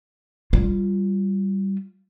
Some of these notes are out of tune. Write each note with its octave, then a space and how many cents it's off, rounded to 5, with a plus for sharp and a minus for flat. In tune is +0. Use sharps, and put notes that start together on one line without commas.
G3 -10 F4 +0